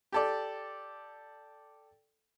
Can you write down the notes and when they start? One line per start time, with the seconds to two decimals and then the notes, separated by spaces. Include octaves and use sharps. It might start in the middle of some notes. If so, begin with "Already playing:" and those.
0.12 G4 A4 D5